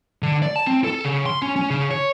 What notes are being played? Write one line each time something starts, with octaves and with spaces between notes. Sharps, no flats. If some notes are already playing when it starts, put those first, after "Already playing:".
D3
D5
A5
C4
A4
C#3
C6
C#4
C#4
C#3
C#5